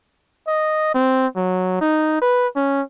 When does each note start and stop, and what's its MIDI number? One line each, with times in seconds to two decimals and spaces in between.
0.47 0.90 75
0.94 1.27 60
1.36 1.78 54
1.81 2.17 63
2.21 2.47 71
2.55 2.81 61